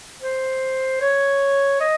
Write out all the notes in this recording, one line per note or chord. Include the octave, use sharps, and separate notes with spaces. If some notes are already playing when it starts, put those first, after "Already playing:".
C5
C#5
D#5